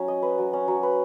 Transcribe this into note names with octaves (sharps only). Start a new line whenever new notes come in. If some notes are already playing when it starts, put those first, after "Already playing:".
Already playing: F#3 C#4
D#5
B4
F#3
C#4
F#3
B4